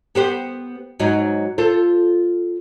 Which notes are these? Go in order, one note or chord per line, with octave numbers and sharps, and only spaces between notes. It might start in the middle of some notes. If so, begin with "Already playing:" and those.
B3 G4 C5
G#2 F#3 D#4
F4 A4 C5